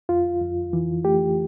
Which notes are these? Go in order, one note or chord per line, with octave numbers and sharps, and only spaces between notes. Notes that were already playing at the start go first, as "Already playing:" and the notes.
F2 F4
F2
E3
A3 G4